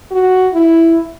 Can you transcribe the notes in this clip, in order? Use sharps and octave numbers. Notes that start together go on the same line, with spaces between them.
F#4
E4